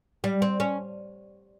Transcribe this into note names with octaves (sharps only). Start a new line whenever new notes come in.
G3
C4
C#4